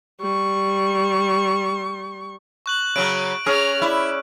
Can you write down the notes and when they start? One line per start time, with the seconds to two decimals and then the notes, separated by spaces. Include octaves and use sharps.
0.20 G3 C#6
2.66 C#6 F#6 F#7
2.96 C#3 F#3 D7
3.46 C#4 G#4 A#5 F6
3.82 E4 D5